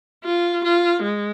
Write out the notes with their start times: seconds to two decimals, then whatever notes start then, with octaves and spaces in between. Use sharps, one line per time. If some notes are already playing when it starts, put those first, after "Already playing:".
0.24 F4
0.64 F4
1.03 G#3